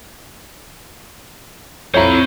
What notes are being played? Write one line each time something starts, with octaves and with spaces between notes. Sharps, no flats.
F2 E4 C5 C#5 A#5 B5